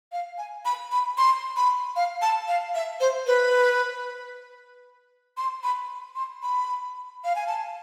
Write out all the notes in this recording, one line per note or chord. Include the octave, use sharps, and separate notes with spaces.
F5
G#5
B5
B5
C6
B5
F5
A5
F5
E5
C5
B4
C6
B5
C6
B5
F5
G#5
A5